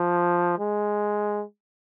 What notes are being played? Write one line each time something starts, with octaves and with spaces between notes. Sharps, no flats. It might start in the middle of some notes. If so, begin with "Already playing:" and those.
Already playing: F3
G#3